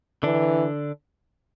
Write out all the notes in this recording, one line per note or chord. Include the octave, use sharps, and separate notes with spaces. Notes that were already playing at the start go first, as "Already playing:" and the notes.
D3 E3 D4